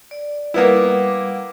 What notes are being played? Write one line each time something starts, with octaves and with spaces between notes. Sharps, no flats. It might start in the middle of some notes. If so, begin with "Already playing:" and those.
D5
G3 A#3 B3 E4 F#5 D6